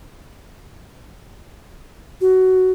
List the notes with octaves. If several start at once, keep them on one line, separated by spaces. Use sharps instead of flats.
F#4